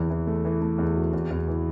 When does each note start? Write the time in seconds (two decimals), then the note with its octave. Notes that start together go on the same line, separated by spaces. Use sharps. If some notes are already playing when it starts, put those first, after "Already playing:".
Already playing: E2 E3
0.10 E3
0.27 A3
0.45 E3
0.62 A3
0.78 E2
0.96 F#4
1.13 E2
1.30 E2
1.48 E3